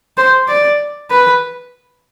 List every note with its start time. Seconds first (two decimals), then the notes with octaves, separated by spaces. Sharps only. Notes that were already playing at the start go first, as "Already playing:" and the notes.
0.17 C5
0.48 D5
1.10 B4